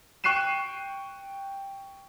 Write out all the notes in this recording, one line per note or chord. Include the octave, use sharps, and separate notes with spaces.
G5 C#6 F#6 C7 D#7 E7